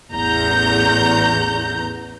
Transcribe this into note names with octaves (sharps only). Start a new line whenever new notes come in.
A1 E2 A#5 G6